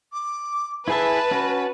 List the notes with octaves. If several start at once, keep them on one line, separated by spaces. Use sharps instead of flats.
D6
E4 G#4 B4 E5 A5 B5
C#4 F#4